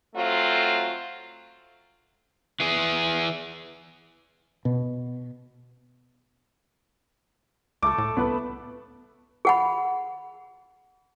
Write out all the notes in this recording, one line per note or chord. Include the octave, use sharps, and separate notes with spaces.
F#3 A3 C4 F4
E3 G#4
B2
C#2 A3 A4 D6
A2
C2 B3 B4
G#4 F#5 B5